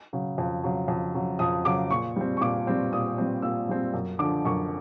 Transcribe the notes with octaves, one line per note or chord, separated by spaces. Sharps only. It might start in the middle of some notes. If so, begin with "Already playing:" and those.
C#3 F#3
F2
C#3 F#3
F2
C#3 F#3
F2 D#6
C#3 F#3 D6
A#2 C#6
G3 C4
C#6
A#2 D6
G3 C4
A#2 D#6
G3 C4
A#2 E6
G3 C4
F#2
D3 F3 D6
F#2 C#6